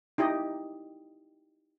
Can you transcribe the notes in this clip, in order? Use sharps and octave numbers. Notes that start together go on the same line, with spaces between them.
D#4 E4 G4 D#5